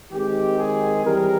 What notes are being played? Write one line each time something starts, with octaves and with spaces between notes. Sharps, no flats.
D#3 G#3 C4 G4
G#4
E3 G3 C4 A#4